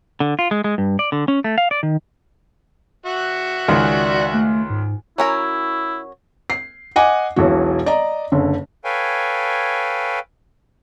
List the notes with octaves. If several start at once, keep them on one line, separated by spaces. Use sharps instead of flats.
D3
F4
G#3
G#3
G2
D5
D3
C#4
A3
F5
D5
D#3
F#4 E5 F#5
C#2 D#3 D5
A3
G#2
F#3 C#4 E4 A#4
C7
D#5 F#5 G#5 D6
E1 B1 E3 F#4
D5 D#5 A#5
F#1 D3
A4 B4 C#5 F5 G5 G#5